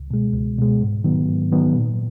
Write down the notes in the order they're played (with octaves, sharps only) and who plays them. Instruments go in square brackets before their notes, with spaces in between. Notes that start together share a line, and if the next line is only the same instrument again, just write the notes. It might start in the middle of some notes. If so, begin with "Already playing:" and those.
Already playing: [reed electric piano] C#2
B2 G#3
C#2
B2 G#3
G#2
D#3 F#3 B3
G#2
D#3 F#3 B3
A#2